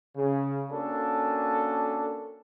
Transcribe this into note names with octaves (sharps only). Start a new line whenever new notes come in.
C#3
A#3 C#4 D4 F#4 A4